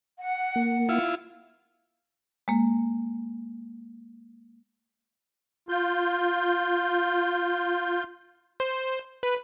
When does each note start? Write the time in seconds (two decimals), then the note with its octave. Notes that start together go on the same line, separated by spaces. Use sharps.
0.19 F#5
0.56 A#3
0.89 E4 F4
2.48 G#3 A#3
5.69 F4 G6
8.60 C5
9.23 B4